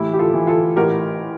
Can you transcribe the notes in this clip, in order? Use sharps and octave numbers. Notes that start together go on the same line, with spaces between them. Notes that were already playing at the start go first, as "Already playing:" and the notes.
Already playing: A2 E3 E4 G4
G4
F4 A4
E3
F4 A4
A1 G4 A#4